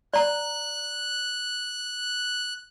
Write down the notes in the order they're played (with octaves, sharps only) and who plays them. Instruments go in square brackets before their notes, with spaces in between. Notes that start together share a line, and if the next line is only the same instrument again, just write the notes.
[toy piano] D5 A#5 [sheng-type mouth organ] F#6